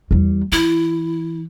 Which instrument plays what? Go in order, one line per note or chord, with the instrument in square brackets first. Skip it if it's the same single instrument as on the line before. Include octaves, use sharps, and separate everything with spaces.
[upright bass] E2 G3
[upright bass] E3 [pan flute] E4